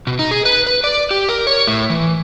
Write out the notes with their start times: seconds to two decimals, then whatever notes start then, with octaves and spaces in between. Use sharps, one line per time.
0.07 B2
0.19 D#4
0.31 G#4
0.45 B4
0.67 B4
0.84 D5
1.11 G4
1.29 A#4
1.47 C#5
1.67 A2
1.90 E3